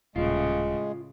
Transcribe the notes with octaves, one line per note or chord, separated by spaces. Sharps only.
D#1 A2 C#3 G#3 F4